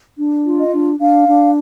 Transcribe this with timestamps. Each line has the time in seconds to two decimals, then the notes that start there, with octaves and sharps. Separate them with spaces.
0.19 D4
0.46 F4
0.59 D#5
0.73 D4
1.00 D4 F5
1.27 D4